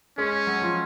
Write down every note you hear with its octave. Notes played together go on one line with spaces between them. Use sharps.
G#3 C#4 G#4
F#3 F#4
F3 F4